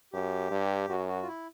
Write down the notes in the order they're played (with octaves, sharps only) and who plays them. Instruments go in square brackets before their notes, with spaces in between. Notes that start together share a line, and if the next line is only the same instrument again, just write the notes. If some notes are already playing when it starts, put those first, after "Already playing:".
[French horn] F#2 [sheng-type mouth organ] G4
[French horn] G2
[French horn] F#2 [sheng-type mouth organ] F#4
[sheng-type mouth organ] F#4
F4
E4